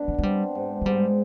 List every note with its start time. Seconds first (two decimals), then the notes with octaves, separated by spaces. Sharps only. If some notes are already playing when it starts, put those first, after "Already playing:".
Already playing: B2 D4
0.08 G#3
0.19 G#3
0.23 G3 C4
0.55 G#2
0.82 G#3
0.86 G#2 G3